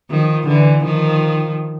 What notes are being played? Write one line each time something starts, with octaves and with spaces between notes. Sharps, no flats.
D#3 F3
D3 E3
D#3 F3